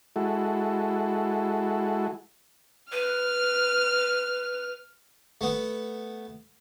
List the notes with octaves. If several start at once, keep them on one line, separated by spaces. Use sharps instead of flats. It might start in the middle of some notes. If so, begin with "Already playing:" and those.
G#3 E4 F#4 A4
B4 F6
A3 B3